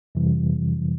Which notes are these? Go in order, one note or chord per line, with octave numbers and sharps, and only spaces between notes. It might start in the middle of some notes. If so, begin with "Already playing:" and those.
F2 C3 E3 G3